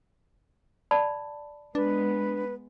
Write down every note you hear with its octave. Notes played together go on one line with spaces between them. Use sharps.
D5 A5 B5
G#3 B3 D4 B4